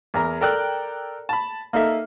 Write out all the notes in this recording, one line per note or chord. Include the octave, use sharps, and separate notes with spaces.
E2 A#4 A#5
A4 A#4 D5 G5 E6 F#6
A5 B5
A#3 D#4 A4 A#4 E5